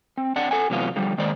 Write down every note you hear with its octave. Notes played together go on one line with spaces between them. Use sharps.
C4
C4 D4 F#5
A4 F#5 G#5
C3 E3 F#3 A3 B3 F4
D3 F3 G3
D#3 G#3 A#3 C5 D5